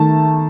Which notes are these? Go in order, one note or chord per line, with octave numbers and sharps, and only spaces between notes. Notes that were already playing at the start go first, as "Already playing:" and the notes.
Already playing: D#3 A3 A5